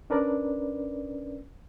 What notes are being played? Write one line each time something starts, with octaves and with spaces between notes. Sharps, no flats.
C#4 D4 A#4 B4 D5